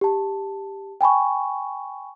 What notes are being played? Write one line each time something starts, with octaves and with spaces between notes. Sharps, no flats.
G4 A5
G5 G#5 B5 C#6